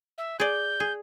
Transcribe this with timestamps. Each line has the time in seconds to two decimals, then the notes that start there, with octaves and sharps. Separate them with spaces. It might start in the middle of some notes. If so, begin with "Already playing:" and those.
0.18 E5
0.40 G#4 D5 G6
0.80 G#4